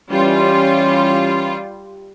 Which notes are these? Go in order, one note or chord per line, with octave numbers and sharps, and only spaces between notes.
E3 G3 C#4 F4